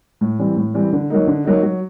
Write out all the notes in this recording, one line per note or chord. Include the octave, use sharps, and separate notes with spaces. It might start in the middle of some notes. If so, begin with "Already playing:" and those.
A2
E3 G3 C4
A2
E3 G3 C4
D3
F#3 A#3 D#4
D3
F#3 A#3 D#4
F#3